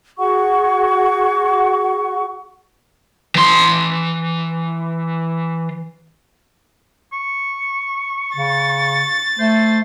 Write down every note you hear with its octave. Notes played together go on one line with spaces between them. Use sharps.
F#4 G#4 F#5 C#6
E3 C6
C#6
C#3 A6
A3 C5